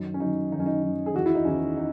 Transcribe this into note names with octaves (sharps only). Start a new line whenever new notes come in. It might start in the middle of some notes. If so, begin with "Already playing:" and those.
Already playing: F#2 D#3
C#4
F#2 D#3 D#4
F#2 D#3 C#4 D#4
D#4
F#2 D#3
G#4
E2 D#3 F#4
E4
D#4
E2 D#3 C#4
D#4